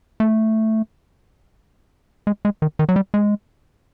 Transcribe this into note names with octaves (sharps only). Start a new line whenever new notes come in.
A3
G#3
G#3
D#3
D#3
F#3
G3
G#3